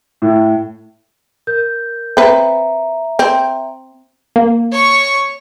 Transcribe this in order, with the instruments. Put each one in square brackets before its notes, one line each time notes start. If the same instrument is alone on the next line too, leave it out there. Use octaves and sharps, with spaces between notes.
[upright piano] A2
[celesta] A#4 G6
[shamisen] C4 B4 [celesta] E5 A#5
[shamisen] C4
[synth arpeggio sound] A#3
[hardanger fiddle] C#5 C#6